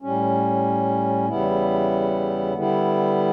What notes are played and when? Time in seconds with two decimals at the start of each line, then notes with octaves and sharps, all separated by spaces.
0.02 A2 G3 C#4
1.28 E2 C#3 G3 B3 E4
2.54 D3 G3 B3 E4